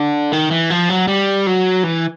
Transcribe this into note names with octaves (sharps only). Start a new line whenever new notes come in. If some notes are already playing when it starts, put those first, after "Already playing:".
Already playing: D3
D#3
E3
F3
F#3
G3
F#3
E3